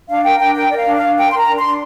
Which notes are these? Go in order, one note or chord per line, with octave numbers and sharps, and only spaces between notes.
D4 F5
A#4 G5
D4 G5
A#4 G5
A#4 D5
F5
D4
D4 F5
A#4 G5
A#4 C6
A#5
D4
C6
D4